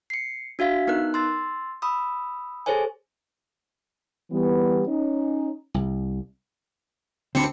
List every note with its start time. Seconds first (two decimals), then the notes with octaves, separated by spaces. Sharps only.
0.10 C7 C#7
0.59 D4 F#4 E5 F5 B6
0.87 B3 D#4 A#4 F#6
1.14 C6 E6 A6
1.82 B5 D#6 E6
2.66 G#4 A4 C5 C#5 G#5
4.31 E3 G3 B3
4.87 C#4 D#4
5.74 C2
7.35 D2 C4 D4 B5 C#7